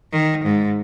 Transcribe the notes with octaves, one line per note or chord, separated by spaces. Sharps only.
D#3
G#2